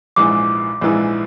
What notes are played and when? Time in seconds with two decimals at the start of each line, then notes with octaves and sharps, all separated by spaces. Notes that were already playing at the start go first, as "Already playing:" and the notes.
0.16 A#1 G#2 E3 G#3 D6
0.81 A#1 G#2 E3 G#3